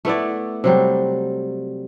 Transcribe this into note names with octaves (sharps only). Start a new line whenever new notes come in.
A3 B3 E4 D5
C3 F#3 G3